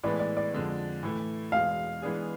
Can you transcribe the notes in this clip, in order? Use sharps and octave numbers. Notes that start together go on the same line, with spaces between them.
A2 E3 G#3 B3 D5
D5
D5
F2 D3 G#3
A2 E3 A3
E2 B2 G#3 F5
E3 G#3 B3 D4 G#4